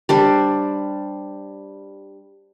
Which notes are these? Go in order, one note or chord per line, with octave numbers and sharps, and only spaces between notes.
G3 D4 C5